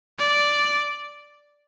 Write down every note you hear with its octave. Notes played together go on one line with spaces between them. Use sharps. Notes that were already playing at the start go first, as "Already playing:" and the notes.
D5